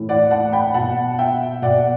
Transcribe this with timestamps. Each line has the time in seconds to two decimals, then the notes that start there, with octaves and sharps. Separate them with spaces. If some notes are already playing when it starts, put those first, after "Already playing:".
Already playing: A2 E3
0.09 D5 F#5
0.31 F#5 A5
0.52 G5 B5
0.74 B2 F#5 A5
1.19 E5 G5
1.62 B2 D5 F#5